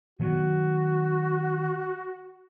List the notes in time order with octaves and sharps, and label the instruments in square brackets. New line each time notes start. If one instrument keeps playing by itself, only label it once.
[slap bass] D#3 F#3 B3 [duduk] F#4